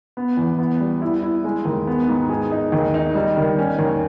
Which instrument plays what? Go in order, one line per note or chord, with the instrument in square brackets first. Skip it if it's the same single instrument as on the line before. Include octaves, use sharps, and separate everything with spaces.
[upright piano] B3
E2
B3
G3
E4
E4
G#3
D#2
B3
G#2
G#4
D#4
D#2
D#4
G3
D#3
C#4
D#2